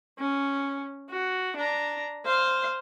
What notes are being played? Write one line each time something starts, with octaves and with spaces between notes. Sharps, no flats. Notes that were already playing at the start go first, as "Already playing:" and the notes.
C#4
F#4
D4 A#5
C5 F5